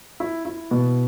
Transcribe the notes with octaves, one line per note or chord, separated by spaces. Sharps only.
E4
E4
B2